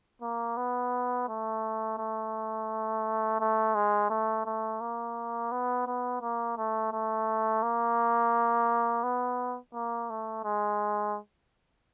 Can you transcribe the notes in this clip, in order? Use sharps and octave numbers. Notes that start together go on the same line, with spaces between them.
A#3
B3
A3
A3
A3
G#3
A3
A3
A#3
B3
B3
A#3
A3
A3
A#3
B3
A#3
A3
G#3